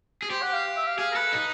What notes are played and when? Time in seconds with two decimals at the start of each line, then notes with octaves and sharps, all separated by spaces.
0.22 G#4
0.30 G4 C5
0.42 F#5
0.53 F5
0.77 E5
0.87 F5
0.99 G#4 F5
1.12 A#4
1.16 A4 B4
1.33 D#4